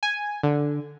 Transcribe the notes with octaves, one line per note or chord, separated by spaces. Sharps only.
G#5
D3